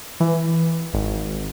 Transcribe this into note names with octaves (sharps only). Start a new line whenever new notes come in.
E3
G#1